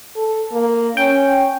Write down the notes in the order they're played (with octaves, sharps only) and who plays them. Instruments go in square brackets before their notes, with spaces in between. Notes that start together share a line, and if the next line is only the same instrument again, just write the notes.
[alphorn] A4
A#3
[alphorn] C#4 [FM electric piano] G5